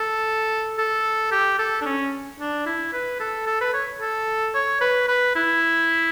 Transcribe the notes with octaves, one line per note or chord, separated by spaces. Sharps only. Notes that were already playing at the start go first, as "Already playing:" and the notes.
Already playing: A4
A4
G4
A4
D4
C#4
D4
E4
B4
A4
A4
B4
C#5
A4
C#5
B4
B4
E4